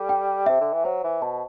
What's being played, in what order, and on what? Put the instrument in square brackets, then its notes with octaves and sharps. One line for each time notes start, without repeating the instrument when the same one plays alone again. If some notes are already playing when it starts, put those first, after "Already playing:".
Already playing: [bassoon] G3 [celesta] A4
[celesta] G5
[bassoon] C3 [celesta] E5
[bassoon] D3
E3
[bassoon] F#3 [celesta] C5
[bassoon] E3
[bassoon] B2 [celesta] A5